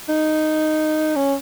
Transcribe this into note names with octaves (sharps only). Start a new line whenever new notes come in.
D#4
C#4